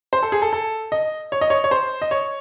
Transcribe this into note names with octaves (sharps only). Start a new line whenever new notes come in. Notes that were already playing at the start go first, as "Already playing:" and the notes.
C5
A4
G#4
A4
A4
D#5
C#5
D#5
C#5
C#5
C5
D#5
C#5